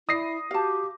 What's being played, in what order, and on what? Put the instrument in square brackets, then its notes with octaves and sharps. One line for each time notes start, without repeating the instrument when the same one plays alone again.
[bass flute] E4 [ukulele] D5 [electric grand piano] D#6 A#6 C7
[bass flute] F#4 [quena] G4 [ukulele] F5 A5